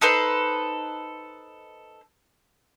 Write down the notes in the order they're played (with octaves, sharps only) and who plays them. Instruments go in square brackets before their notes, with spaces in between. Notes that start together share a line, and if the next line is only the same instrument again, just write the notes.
[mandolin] D#4 A4 B4 C5